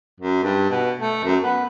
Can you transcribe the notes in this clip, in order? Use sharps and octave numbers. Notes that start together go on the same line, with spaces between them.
F#2
G2
B2
A3
F#2
B3